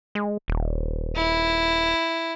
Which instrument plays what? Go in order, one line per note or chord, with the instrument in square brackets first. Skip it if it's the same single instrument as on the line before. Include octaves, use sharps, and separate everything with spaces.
[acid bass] G#3
D#1
[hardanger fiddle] E4